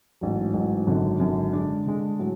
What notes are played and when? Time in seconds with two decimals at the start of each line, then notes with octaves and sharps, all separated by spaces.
0.21 A1 G#2 F#3
0.54 A1 G#2 F#3
0.87 G#1 F#2 D3
1.20 G#1 F#2 D3
1.53 D3 G#3 D4
1.86 D3 G#3 D4
2.19 A2 F#3